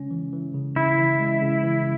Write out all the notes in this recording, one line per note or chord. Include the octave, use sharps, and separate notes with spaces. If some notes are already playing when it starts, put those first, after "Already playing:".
Already playing: C#3 G#3 C#4
E3
E3
C#3
C#3 E4
E3
G#3
C#3
E3